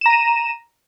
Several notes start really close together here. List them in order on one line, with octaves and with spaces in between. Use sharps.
E7 A#5 D#7